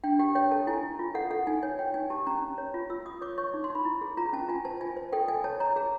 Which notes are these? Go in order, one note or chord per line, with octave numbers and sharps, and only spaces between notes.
D4 G5
G4 G5
C#5 G5
A4 A5
E4 G#5
E4
F4
A4 F#5
A4 F#5
D#4 G#5
C#5 G#5
C#5 G5
D#4 G#5
G4 A5
C#4 A#5
C#4
C#5
F4
F4 E6
F4 D#6
C#5 D6
C#5 C#6
D#4
C6
D#4
B5
E4
G#4
F4 A#5
C#4 A5
F4 G#5
C5 A5
F4 G#5
C5
A4 G5
A4 G#5
C#5 A5
C#5 A#5
G#4 A#5